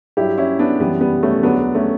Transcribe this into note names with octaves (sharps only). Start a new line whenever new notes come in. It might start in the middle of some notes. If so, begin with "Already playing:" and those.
G2 F#3 E4 G4
C#4 E4
B3 D4
F#2 E3 G3 B3
G3 B3
A3 C#4
E2 D3 F#3 B3 D4
A3 C#4